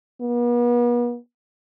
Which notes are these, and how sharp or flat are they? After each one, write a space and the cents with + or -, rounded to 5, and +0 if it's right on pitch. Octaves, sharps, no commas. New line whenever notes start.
B3 -40